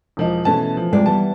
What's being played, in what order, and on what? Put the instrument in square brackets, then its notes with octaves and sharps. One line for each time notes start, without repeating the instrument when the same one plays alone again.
[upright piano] E1 F3 D#4
[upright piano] B2 C#4 A5 [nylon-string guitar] E3 A3
[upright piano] F3
[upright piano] F2 C3 [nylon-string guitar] G3 G#3 D5
[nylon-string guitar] E3 G3 B3 [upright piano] A5